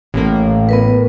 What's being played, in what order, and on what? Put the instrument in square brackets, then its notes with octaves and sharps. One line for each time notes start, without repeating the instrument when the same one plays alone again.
[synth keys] A1 A#3 [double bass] A2
[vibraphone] B3 A#4 B4